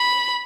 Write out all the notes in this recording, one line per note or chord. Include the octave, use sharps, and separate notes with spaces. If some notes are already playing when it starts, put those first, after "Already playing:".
Already playing: B5